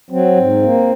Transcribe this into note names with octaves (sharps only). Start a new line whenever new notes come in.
F#3 C4
G#2
A#3